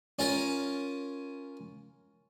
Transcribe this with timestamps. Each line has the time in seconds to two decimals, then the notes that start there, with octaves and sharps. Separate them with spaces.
0.19 C#4 F4 A#4